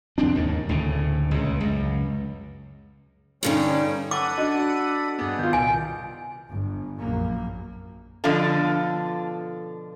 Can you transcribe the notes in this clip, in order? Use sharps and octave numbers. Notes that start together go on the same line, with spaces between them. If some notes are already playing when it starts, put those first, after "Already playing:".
C2 F2 C4 D4
D#2 G#2
D2 A2 C#3
C#2 A#2
C#2 F#2
G2 D3 G3 C#4 D#4
A4 D5 F#5 B5 D6 D#7
D4 F#4 D#5
G2 B3 G#4 D5
D#3 F4 G6
C2 A#2 G#5
G1
A#1 F#2 A#3
B2 D3 F3 D4 F4 A4